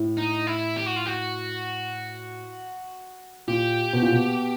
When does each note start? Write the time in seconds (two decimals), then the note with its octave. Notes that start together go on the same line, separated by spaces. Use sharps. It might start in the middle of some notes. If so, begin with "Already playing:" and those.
Already playing: A2
0.17 D#4
0.47 E4
0.77 G4
0.87 F#4
0.97 F4
1.07 F#4
3.48 A#2 G4
3.93 B2
4.02 A#2
4.12 B2